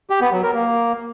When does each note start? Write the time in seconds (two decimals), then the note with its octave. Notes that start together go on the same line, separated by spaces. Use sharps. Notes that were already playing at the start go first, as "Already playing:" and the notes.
0.10 G4
0.21 B3
0.32 F#3
0.43 A#4
0.54 A#3